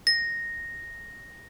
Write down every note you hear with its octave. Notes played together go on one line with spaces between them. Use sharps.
A#6